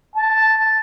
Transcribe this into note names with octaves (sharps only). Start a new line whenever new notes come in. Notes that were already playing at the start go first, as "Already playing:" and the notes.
A5